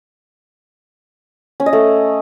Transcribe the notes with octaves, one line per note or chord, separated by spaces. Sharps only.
C#4
D#5
A3